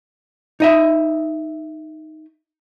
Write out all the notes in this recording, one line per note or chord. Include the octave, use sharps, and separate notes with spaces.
D#4 D#5 E5